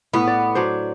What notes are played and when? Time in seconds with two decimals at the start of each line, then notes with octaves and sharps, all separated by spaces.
0.14 A2 B3
0.27 D5
0.55 F#3 D4 C5